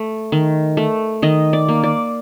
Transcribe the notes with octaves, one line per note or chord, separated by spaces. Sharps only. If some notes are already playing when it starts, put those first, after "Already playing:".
Already playing: A3
D#3
A3
D#3 D#5
D5
A#3
D5